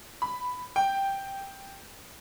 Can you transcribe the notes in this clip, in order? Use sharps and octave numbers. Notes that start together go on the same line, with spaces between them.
B5
G5